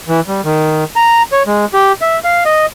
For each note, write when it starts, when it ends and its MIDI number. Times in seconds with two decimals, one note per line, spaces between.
0.08 0.20 52
0.28 0.41 55
0.45 0.84 51
0.96 1.23 82
1.32 1.43 73
1.47 1.65 56
1.74 1.92 67
2.02 2.19 76
2.24 2.44 77
2.46 2.66 75